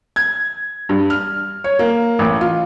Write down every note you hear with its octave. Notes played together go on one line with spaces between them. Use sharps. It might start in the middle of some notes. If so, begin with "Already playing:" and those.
G#6
G2
F6
C#5
A#3
A1
F4